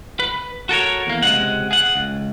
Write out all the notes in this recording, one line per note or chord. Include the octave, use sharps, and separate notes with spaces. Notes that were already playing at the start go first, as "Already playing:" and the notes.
B4
F#4 A4 A#4 C#5
E2 A#3
C#2 C3 G#3 F#5
G#4 F#5
C#2